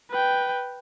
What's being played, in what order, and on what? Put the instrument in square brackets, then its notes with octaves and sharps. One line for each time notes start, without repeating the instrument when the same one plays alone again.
[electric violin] B4 G5